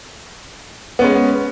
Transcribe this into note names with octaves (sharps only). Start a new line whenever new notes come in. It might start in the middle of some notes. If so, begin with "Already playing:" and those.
G#3 B3 C#4